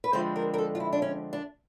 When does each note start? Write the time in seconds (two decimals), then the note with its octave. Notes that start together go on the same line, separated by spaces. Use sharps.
0.04 B4
0.13 D3 F3 G#3 C4 C5
0.36 A#4
0.54 A#4
0.58 A4
0.75 F4
0.80 E4
0.93 D4
1.02 C#4
1.33 D4